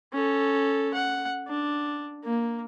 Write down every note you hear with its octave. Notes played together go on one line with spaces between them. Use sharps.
C#4 A4
F#5
D4
A#3